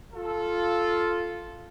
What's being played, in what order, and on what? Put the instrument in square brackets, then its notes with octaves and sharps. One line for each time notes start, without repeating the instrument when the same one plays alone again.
[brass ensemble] F4 A4